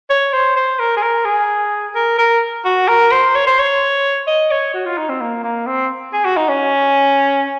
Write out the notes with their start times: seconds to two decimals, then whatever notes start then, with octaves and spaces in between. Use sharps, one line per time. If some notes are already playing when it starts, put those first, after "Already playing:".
0.10 C#5
0.33 C5
0.56 C5
0.79 A#4
0.97 G#4
1.03 A#4
1.26 G#4
1.95 A#4
2.19 A#4
2.65 F#4
2.88 A#4
3.12 C5
3.35 C#5
3.47 C5
3.59 C#5
4.27 D#5
4.51 C#5
4.74 F#4
4.86 F4
4.98 D#4
5.09 C4
5.21 A#3
5.43 A#3
5.67 C4
6.13 G#4
6.25 F#4
6.37 D#4
6.49 C#4